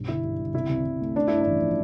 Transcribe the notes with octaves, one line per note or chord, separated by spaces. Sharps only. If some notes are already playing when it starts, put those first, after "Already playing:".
Already playing: B1 G2
G1 E4
G2
G1
C2 E4
C2
C2
A3
A3 D4
G2 E4
D4
A1
F3